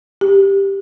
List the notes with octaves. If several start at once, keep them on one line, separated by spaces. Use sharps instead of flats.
G4